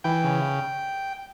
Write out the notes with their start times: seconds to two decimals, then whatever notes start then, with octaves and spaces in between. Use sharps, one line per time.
0.04 E3 G5
0.24 C#3